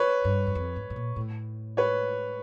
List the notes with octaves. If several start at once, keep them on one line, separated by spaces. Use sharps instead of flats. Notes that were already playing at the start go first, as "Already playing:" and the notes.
Already playing: B4 C#5
G2
F#2
F2
G#2
A2
A#2
A2
B4 C#5